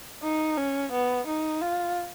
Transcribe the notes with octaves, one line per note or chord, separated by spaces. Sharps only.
D#4
C#4
B3
D#4
F4